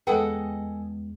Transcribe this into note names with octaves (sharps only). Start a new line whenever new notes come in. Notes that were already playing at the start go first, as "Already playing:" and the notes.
E2 G#3 G#4 A4 B4 D#5 F#5 G5